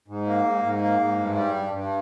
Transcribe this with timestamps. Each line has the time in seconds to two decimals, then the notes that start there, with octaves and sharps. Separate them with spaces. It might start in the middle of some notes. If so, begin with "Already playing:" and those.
0.08 G#2
0.27 A#3
0.44 G#2
0.63 G#2
0.81 A#3
0.99 G#2
1.18 G2
1.36 G3
1.54 G2
1.73 G2